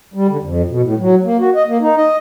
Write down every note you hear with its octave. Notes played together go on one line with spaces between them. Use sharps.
G3
D3
F2
B2
A2
F#3
A#3
F#4
D#5
A#3
D#4
D#5